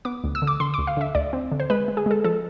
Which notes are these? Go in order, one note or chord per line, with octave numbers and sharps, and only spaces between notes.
B3 D6
D2
E6
D3
D6
D3 C6
D2 D6
F5
D3 E5
D2 D5
C4
D3
C5
G#3 B4
G#3
G#4
G#3 A4
F3 A4